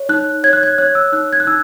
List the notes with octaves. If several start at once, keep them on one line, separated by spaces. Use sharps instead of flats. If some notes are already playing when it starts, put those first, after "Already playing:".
Already playing: C#5
D#4 F#6
C#5 G#6
F#6
G#6
C#5 F#6
E6
D#4 F#6
G#6
F#6
D#4 E6